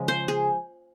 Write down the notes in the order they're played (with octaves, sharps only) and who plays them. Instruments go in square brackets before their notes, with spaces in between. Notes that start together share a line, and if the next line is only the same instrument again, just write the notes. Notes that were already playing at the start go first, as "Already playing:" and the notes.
Already playing: [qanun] C#3 F3 G#3
C5
G#4